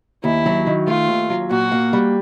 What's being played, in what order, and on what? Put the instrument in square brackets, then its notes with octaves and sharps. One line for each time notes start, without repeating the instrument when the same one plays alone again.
[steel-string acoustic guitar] D#2 [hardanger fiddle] E4
[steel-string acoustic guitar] F#3
D#3
[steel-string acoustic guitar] A3 [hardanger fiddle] F4
[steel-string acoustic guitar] D#2
F#3
[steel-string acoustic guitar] A#2 [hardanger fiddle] F#4
[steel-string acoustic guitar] A#3
G3